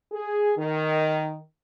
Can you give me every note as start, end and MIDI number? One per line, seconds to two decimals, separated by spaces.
0.12 0.52 68
0.57 1.39 51